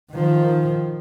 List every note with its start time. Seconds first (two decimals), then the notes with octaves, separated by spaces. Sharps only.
0.12 D#3 F3